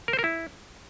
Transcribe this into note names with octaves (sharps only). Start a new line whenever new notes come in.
A#4
C5
A#4
E4